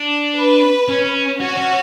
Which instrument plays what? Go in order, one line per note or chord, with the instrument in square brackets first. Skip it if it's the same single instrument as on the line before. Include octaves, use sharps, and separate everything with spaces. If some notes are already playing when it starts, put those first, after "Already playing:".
Already playing: [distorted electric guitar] D4
[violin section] B4
[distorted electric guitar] C#4
[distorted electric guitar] C#4 [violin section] F#4
[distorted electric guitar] C#4